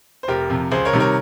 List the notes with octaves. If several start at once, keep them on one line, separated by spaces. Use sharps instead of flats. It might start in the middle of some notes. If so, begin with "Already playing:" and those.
C5
F1 G4 A#4
F2 C3
C#2 G#4 C5
A#4 C#5
C3 D#3 G3
A#4 C#5